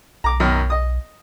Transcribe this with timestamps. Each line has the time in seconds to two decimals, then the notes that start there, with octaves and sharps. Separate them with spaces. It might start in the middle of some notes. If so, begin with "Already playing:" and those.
0.24 B1 A#5 D6
0.40 F#2 B2 D#3
0.70 D#5 D#6